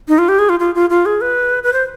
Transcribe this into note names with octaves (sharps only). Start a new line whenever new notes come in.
D#4
F4
G4
G#4
F4
F4
F4
F4
G#4
B4
B4
C5